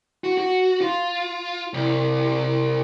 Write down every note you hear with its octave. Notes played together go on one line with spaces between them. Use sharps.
F#4
F#4
F4
C2